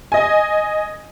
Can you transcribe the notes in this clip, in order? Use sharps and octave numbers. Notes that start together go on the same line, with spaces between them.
D#5 G#5